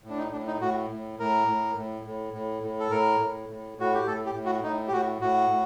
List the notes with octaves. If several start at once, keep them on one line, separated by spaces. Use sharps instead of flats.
A2
D4
D#4
A2 D4
D#4
A2 F#4
A2
A2 A#4
A2
A2
A2
A2
A2
A4
A2 A#4
A2
A2
A2 F#4
G4
A2 A4
G4
A2
F#4
A2 D#4
G4
A2 F#4
A2 F#4
A2